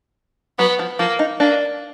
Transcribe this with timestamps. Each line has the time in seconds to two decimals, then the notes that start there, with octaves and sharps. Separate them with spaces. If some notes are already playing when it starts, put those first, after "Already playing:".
0.58 F#3 B3
0.79 F3
0.99 F3 A#3
1.19 D#4
1.40 A#3 D4